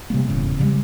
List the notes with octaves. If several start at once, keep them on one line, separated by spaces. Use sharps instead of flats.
C3 G3 A#3
D#1 E2 G#2 C#3
C#3 F3 G3 G#3